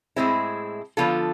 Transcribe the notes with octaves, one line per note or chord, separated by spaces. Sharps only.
A2 G#3 C4 E4 G#4
D3 F3 B3 F4 A4